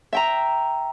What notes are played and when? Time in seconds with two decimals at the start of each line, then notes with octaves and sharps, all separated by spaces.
0.13 E5 G5 A#5